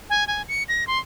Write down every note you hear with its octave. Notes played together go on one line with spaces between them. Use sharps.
G#5
G#5
C#7
A#6
C6